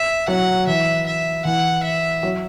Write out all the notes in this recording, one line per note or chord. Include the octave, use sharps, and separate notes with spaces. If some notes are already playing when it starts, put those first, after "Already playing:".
Already playing: E5
F#3 F#5
E3 E5
E5
E3 F#5
E5
F#3